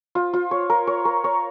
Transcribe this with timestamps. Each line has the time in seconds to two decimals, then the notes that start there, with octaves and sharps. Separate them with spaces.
0.15 F4
0.33 F4
0.51 C#5
0.70 A#4
0.87 C#5
1.05 A#4
1.24 C#5